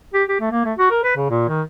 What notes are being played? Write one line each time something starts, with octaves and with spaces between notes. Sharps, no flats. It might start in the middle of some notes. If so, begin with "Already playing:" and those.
G4
G4
A3
A#3
A3
F#4
A#4
B4
C#3
A#2
D#3